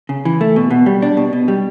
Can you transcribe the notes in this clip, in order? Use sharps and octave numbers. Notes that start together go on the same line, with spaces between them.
C#3
E3
A3
B2
B2
G3
D4
B2
B2
G3